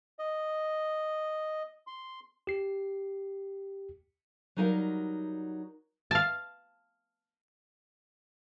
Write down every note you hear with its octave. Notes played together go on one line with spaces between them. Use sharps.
D#5
C6
G4 C7
F#3 G3 D#4 A#4 F5
F5 A5